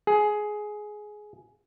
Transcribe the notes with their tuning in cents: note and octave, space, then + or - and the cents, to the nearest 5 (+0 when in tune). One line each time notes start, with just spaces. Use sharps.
G#4 +15